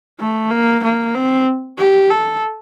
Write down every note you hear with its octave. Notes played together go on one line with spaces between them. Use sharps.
A3
A#3
A#3
C4
G4
A4